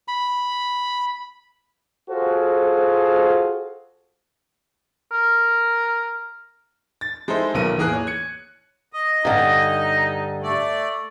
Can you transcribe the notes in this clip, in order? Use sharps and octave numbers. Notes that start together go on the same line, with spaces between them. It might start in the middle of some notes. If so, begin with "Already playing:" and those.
B5
F4 F#4 G#4 A4 C5
A#4
A6
G#3 D#4 E4 A4 C5
D#1 B1 B3 A#4 D#7
E2 A2 A#3 G#4 A#4 F#6
C#5
G#6 C#7
D#5
G2 D3 D#4
A3 D5